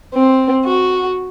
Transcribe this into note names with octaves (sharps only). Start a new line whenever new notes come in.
C4
F#4